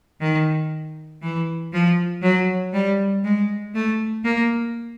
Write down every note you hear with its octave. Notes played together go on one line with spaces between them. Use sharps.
D#3
E3
F3
F#3
G3
G#3
A3
A#3